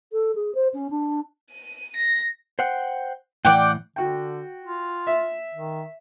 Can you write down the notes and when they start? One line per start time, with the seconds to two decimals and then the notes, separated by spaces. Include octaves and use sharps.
0.12 A4
0.35 G#4
0.55 C5
0.74 C#4
0.90 D4
1.51 D#7
1.96 A#6
2.59 C5 F#5 G5
3.45 A2 E3 D5 F#5 G5
3.96 D3 F#4 G5
4.65 F4
5.07 E5
5.54 D#3